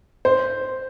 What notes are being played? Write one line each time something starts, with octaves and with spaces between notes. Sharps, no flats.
C5